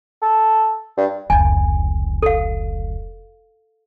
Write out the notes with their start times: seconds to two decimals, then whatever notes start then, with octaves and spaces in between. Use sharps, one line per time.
0.22 A4
0.98 G2
1.30 F1 C#2 G#5
2.23 A4 F5